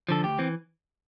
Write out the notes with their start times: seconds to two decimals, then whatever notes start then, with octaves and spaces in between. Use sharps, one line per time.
0.09 D3 F3 A4
0.23 D2 G4
0.39 E3 C4